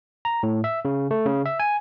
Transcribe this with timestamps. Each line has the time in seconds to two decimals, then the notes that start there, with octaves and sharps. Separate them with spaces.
0.25 A#5
0.43 A2
0.64 E5
0.85 C#3
1.11 A3
1.26 C#3
1.45 E5
1.60 G#5